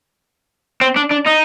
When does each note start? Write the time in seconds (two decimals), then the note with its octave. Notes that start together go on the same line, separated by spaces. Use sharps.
0.81 C4
0.96 D4
1.11 D4
1.27 D#4